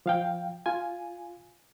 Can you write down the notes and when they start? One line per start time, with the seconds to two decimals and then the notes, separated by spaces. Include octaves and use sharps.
0.06 F3 F5 G5
0.66 F4 G#5